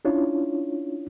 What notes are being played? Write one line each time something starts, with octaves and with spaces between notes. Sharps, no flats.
C#4 D4 E4 F4 C#5